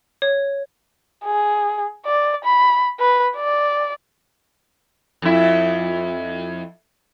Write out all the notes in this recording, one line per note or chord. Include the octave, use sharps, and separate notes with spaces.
C#5
G#4
D5
B5
B4
D5
F2 E4